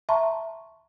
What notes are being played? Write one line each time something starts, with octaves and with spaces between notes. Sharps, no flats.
E5 A5 A#5 C6 C#6